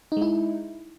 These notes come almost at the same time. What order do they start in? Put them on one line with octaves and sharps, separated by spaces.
D#4 G#3 E4